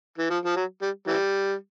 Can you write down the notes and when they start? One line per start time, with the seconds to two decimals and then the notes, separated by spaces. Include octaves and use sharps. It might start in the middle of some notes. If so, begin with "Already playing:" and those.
0.18 E3
0.30 F3
0.45 F3
0.56 F#3
0.81 G3
1.07 E3 G3